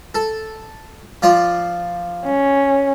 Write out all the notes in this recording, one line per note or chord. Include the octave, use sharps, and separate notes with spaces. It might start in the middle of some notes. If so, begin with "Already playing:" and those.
A4
F3 F4 D5
C#4